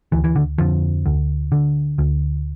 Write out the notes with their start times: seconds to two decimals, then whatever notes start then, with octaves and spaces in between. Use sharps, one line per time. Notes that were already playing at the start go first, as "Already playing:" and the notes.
0.12 D2 E3
0.24 E3
0.36 D3
0.58 F2 D3 F3
1.06 D2
1.52 D3
1.98 D2